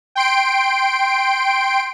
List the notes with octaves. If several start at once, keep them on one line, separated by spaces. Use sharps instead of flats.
G5 C6 D7